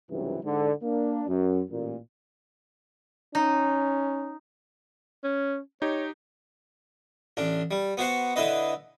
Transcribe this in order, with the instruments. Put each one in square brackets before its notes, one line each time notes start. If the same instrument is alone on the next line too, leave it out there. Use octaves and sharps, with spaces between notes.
[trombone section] C#2 G2 C3 E3 F#3
G#2 D3
A#3 D4
F#2
A1 A#2
[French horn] C#4 [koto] D#4
[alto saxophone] C#4
[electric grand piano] D#4 G4 [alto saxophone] C#5
[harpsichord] A1 D4
G3
B3 F#4 C5 F#5
D3 E4 B4 D#5